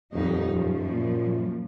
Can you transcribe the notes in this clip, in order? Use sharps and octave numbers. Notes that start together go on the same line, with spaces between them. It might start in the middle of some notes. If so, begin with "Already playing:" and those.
D#1 F2 F#3 D#4
F#2 F3
A#2